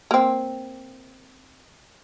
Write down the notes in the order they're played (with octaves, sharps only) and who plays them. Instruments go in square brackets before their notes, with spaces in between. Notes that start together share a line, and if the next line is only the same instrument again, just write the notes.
[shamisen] A#3 C4